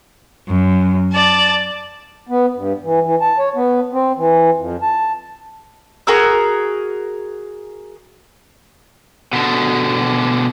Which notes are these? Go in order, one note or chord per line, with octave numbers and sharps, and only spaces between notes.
F#2
D5 A5
B3
G2
E3
E3
A5
C#5
B3
C4
E3
F2
A5
F#4 G#4 A#4 E6
B2 D3